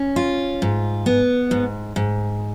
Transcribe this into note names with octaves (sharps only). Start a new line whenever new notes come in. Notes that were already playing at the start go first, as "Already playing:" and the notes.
Already playing: C#4
F4
G#2
B3
G#2
G#2